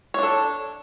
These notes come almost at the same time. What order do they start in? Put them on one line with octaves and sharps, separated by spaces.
C#5 D4 A4